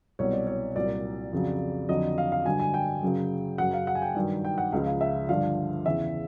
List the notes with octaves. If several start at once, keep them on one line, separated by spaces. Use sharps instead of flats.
C2 B2 F#3 C#5
D5
C#5
C2 A#2 F#3 D5
F2 C#3 F#3
F2 D3 F#3 D#5
F5
F5
G2 D3 F#3 G#5
G#5
G5
F#2 C#3 F#3
F#2 C#3 F#3 F#5
F5
F#5
G#5
G5
G2 D#3 F#3
G5
F#5
C#2 C#3 F3 F5
F5
E5
G2 D3 F3 F5
E2 C#3 E3 E5